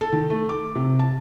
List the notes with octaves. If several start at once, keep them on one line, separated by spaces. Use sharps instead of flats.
A4
D#3
A3
D6
C3
A5